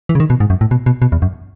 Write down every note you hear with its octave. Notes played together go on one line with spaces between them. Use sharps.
E3
C#3
D#3
B2
G#2
F#2
A2
B2
B2
B2
E2
F#2